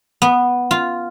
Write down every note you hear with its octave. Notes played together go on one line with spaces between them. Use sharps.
B3
F4